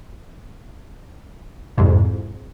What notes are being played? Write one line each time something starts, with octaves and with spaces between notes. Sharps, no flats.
C2 F2 G#2